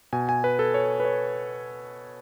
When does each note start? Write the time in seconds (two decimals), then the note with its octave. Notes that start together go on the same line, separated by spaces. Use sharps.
0.13 B2 G#5
0.29 G#5
0.44 B4
0.59 A4
0.74 C#5
1.00 B4
1.05 C#5